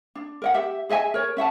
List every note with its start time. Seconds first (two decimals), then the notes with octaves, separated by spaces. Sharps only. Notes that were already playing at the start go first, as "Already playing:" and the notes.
0.15 D4
0.42 A#4 D#5 F#5
0.54 G4 E5
0.89 G#4 D#5 E5 G#5
1.14 A#4 C#5
1.37 C#4 E5 F#5 A5